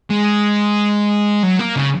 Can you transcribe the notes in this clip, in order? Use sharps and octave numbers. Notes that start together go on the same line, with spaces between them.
G#3
F#3
A#3
C#3